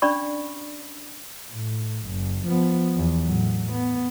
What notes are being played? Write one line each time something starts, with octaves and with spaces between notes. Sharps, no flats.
C#4 D4 D5 B5 C#6
A2
F#1
F3 B3
E2
A2 F#3
B3